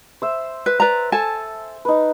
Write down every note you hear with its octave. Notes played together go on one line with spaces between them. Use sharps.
C5 E5
B4
B4 D5 A#5
A4 G#5 A5
D#4 B4